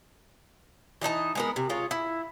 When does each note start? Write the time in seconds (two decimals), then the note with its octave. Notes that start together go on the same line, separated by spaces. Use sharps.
1.01 E3 D4 D#4 A5
1.35 G#3 B3 A#4
1.56 C3
1.70 G#3 F4 C#5
1.91 E4